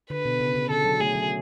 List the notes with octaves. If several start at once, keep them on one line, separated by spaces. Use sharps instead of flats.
D3 B4
B2
C#3
C#3
D3 A4
F#3
A3 G#4
F#3